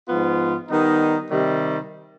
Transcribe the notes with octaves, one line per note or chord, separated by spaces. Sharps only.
G#2 F3 B3 F4
D#3 G3 B3 D#4
C3 D#3 G3